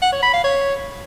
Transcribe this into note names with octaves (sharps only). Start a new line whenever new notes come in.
F#5
C#5
B5
F5
C#5